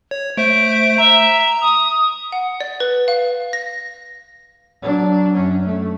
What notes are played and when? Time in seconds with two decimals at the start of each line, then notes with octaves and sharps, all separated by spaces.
0.11 C#5
0.37 A3 C5 E5 D7
0.98 E5 A#5
1.62 D#6
2.32 F#5
2.60 D5
2.80 B4
3.08 F5
3.53 A#6
4.83 F#3 D4
5.34 F#2 C#4
5.66 A3